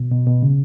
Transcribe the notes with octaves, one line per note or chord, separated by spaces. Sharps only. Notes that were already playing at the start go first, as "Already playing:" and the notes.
Already playing: B2
B2
B2
C#3